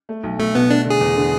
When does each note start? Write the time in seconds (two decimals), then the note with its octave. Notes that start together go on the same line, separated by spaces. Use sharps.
0.09 A3
0.24 B1
0.39 B1 A3
0.55 B2 B3
0.70 A3 D4
0.85 D3
0.90 G#4
1.01 E2
1.16 D3